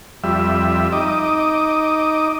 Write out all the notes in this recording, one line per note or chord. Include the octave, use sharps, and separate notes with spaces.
F2 G3 E5
D#4 D#5 D6